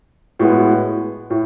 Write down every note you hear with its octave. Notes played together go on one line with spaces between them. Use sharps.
A2 G#3 B3 F#4
A2